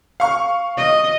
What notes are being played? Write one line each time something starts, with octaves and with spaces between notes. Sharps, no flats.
F5 C#6
D#5